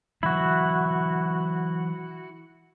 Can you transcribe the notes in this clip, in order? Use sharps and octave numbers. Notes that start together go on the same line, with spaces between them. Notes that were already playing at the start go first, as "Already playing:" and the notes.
E3 F#3 E4 F#4